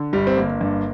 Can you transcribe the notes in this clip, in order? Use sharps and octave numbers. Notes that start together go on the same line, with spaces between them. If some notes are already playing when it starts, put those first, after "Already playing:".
Already playing: D3
G1 G3
C4
G1 A#3
G2